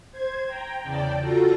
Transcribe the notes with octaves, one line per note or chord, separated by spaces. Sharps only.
C5 G#6
G5 A#5
E2 C#3 D5 G5 A5
F4 F#4 A4 A#5